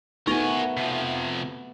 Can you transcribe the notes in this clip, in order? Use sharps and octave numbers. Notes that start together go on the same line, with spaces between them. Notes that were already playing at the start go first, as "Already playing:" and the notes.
A3 B3 D#4 F#4 A#4 G#5 C#6
C3 F3